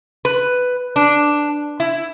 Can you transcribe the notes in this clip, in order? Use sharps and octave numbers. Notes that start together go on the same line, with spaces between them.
B4
D4
E4